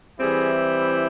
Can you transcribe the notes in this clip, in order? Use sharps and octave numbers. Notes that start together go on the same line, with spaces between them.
E3 G3 C4 E4 G#4